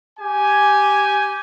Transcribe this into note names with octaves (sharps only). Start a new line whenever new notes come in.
G4 G#5